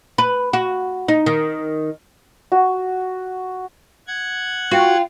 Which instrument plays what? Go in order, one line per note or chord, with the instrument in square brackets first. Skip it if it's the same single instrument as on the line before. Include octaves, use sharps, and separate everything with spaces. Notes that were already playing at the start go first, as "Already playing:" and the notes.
[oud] B4
F#4
D#4
D#3
[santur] F#4
[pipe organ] F#5 G#6
[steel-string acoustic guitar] F4 [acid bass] F#4 [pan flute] G5